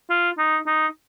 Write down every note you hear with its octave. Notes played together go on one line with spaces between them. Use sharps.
F4
D#4
D#4